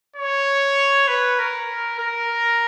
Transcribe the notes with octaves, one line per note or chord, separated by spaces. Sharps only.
C#5
B4
A#4
A#4